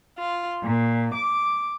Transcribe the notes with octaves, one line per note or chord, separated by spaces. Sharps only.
F4
A#2
D6